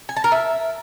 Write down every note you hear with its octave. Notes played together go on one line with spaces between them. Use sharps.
G#5
A5
A#4
E5